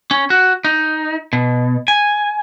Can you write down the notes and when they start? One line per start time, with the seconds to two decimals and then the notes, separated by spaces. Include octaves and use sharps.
0.11 C#4
0.30 F#4
0.65 D#4
1.33 B2
1.88 G#5